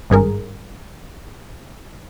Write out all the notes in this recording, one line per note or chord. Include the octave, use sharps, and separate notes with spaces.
G#1 G2 G#4 A#4